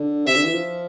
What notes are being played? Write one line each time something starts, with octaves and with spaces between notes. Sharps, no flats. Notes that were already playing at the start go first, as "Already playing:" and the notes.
Already playing: D3
C3 E5
D3
E3
F3